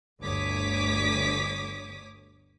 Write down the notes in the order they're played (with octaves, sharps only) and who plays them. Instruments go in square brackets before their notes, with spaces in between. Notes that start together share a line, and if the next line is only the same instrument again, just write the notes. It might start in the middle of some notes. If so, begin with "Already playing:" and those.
[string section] G1 D2 C#5 D6 D#6 B6